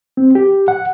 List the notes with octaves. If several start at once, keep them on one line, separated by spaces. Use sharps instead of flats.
C4
G4
F#5